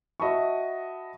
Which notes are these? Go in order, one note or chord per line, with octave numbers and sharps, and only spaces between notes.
F#4 D#5 E5 A5 B5 C#6